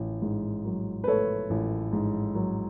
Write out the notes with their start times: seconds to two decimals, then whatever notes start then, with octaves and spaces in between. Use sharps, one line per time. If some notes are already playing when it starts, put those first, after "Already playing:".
Already playing: A1
0.22 G#2
0.65 F#3
1.04 B4
1.07 A3 A4 C#5
1.50 A1
1.93 G#2
2.35 F#3